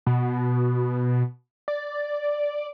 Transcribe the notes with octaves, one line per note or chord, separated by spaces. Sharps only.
B2
D5